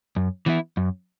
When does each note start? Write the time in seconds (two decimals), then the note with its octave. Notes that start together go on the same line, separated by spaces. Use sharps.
0.16 F#2
0.46 E3 B3 E4
0.77 F#2